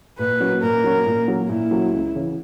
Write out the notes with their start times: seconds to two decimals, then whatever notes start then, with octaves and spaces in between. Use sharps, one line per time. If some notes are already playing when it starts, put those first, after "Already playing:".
0.19 A#2 B4
0.40 F#3 A#3 C#4 F#4
0.62 A#2 A#4
0.84 F#3 A#3 C#4 F#4
1.06 A#2
1.27 F#3 A#3 C#4 F#4
1.49 A#2 E4
1.71 F#3 A#3 C#4 F#4
1.93 C#2
2.15 C#3 E3